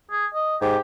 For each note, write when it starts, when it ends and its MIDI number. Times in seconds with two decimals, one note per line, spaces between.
0.11 0.26 68
0.34 0.57 75
0.62 0.77 44
0.62 0.79 67